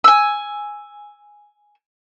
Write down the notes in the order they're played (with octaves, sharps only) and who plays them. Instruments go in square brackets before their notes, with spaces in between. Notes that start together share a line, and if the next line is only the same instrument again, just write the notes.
[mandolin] G#5 E6